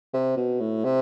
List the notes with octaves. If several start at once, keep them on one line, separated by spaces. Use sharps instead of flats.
C3
B2
A2
C3